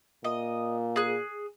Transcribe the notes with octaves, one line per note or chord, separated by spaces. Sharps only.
A#2 D#5
G#4 F#6